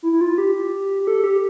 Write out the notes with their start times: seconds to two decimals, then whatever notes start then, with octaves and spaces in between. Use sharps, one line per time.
0.03 E4
0.13 E4
0.21 F4
0.38 G4
1.02 G4
1.07 A4
1.24 G4